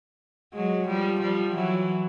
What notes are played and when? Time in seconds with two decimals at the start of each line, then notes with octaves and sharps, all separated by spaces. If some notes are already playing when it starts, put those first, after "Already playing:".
0.53 F#3 G#3
0.87 F3 G3
1.20 F3 G3
1.54 E3 F#3